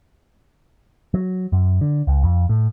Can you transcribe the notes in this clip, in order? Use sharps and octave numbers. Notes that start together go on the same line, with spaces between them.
F#3
F#2
D3
C#2
F2
A2